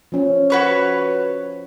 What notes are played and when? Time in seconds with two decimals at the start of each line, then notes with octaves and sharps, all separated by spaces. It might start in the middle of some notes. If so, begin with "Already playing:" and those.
0.12 F3 C#4
0.50 F#4 B4 C#5